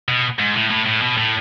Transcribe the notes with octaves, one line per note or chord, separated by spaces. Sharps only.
B2
G#2
A2
A2
A2
B2
A2